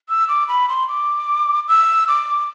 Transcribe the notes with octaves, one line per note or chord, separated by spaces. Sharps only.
E6
D6
B5
C6
D6
E6
D6